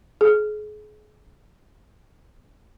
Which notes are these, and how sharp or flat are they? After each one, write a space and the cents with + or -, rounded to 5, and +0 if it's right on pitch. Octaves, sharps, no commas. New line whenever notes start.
G#4 +35